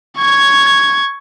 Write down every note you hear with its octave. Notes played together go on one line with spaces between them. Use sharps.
C#6 G#6